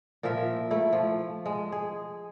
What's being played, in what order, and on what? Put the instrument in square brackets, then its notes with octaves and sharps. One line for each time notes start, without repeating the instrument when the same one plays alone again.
[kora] A#2 F3 A#4 E5
A3 E4
F3
G#3
G#4